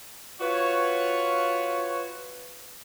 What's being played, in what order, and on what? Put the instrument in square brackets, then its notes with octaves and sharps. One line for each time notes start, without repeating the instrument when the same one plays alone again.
[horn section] F4 F#4 B4 C#5